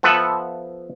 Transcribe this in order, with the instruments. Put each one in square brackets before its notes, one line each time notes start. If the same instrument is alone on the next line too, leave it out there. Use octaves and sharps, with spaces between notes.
[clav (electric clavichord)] F3 B3 A4 B4 E5 F#5